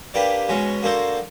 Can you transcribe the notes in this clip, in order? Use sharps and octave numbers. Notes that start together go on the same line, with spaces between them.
A#3 D4 G4 B4 D5
B2 G#3 C#4 F#4
A#3 D4 F#4 A4 C5